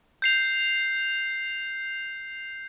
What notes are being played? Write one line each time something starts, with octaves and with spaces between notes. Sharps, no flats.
G6 C7 F7